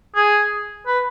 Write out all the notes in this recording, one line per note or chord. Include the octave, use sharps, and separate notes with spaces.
G#4
B4